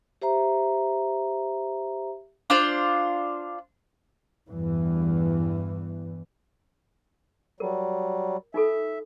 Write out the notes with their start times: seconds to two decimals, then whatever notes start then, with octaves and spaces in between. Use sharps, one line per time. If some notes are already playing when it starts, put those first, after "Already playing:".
0.22 G4 C5 E5 A#5
2.50 D4 F4 C5
4.48 E2 G2 E3
7.60 F#3 G3 A#4
8.54 D#4 F4 A4 E5